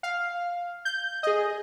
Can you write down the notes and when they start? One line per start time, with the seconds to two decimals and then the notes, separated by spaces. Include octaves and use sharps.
0.03 F5
0.85 G6
1.23 G#4 D#5